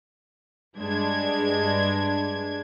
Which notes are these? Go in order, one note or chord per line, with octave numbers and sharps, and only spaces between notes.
G2 G#3 D4 G#6